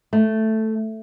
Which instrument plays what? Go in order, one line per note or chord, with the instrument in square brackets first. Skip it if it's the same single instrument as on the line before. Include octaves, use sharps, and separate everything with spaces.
[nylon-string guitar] A3